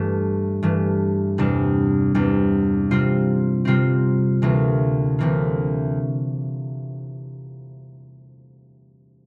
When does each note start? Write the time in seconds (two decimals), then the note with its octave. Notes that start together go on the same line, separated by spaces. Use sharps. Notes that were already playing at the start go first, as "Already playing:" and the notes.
Already playing: G2 E3 A3
0.63 G2 E3 A3
1.38 E2 C3 G3 D4
2.14 E2 C3 G3 D4
2.91 C3 G3 C4 F4 C5
3.65 C3 G3 C4 F4 C5
4.42 D2 C3 E3 A#3
5.19 D2 C3 E3 A#3